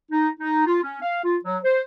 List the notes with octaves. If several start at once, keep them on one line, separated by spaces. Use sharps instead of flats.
D#4
D#4
F4
C#4
F5
F4
F#3
C5